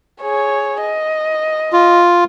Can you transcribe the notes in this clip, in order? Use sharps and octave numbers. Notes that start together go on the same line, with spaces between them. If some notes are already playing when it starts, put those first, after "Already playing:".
G#4 C#5
D#5
F4